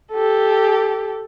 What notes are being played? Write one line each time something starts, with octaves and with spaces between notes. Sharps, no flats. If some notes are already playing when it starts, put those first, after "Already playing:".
G4 A4